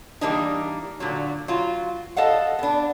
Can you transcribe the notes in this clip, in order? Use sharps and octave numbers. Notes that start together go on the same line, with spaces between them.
E3 G3 G#3 A#3 D4 D#4
A#2 D3 F#3
F#3 F4
A4 D#5 F5 F#5
B3 D4